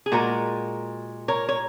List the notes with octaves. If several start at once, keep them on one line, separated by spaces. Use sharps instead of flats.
G#4
A#2 G#3 F#4 A#4
A#4 C#5
C#5